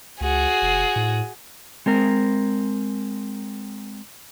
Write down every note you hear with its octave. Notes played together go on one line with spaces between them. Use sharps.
C#2 F#4 G#4
F1
A2
G#3 C4 A#4